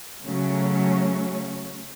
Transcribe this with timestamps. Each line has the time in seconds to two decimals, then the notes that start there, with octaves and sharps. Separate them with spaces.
0.23 C#3 F#3 A3 C#4